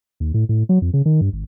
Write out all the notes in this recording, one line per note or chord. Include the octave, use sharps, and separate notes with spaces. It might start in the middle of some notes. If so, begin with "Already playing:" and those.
D#2
A2
A2
F#3
F2
C#3
D#3
G2
G#1